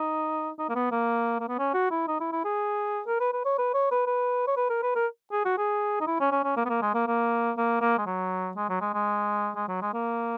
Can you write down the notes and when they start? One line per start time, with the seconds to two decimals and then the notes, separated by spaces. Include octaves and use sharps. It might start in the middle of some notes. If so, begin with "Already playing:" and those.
Already playing: D#4
0.59 D#4
0.69 A#3
0.75 B3
0.92 A#3
1.40 A#3
1.48 B3
1.59 C#4
1.74 F#4
1.91 E4
2.08 D#4
2.20 E4
2.32 E4
2.45 G#4
3.07 A#4
3.20 B4
3.33 B4
3.45 C#5
3.58 B4
3.74 C#5
3.91 B4
4.07 B4
4.47 C#5
4.57 B4
4.70 A#4
4.83 B4
4.95 A#4
5.32 G#4
5.45 F#4
5.58 G#4
6.01 D#4
6.07 E4
6.20 C#4
6.32 C#4
6.44 C#4
6.57 A#3
6.65 B3
6.69 A#3
6.82 G#3
6.94 A#3
7.07 A#3
7.57 A#3
7.81 A#3
7.98 G#3
8.06 F#3
8.56 G#3
8.69 F#3
8.81 G#3
8.94 G#3
9.56 G#3
9.68 F#3
9.82 G#3
9.93 A#3